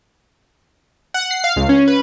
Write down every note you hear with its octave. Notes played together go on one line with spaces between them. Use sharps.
F#5
C7
F5
C#2
C#4
B4